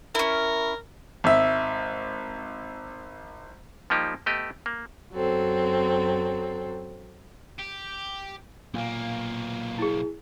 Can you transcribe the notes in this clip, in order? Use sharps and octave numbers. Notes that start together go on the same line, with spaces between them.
C#4 E4 A#4
G#1 E5
F3 G3 A#3 D#4 G4
A3 B3 G4 D#5
A#3
F#2 F#3 C4 A4
G4
B1 A#2 A#3
E4 G#4